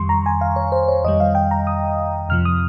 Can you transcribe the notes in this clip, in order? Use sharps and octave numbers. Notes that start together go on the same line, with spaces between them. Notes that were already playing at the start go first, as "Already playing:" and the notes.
Already playing: F2 D#3 G3 C6 C#6
A#5
G#5
F5
C#5
C5
C#5
F2 D#3 G3 D#5
F5
G5
A#5
D#6
F2 C3 F3 F6
D#6